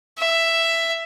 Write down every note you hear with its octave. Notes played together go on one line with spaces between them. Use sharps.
E5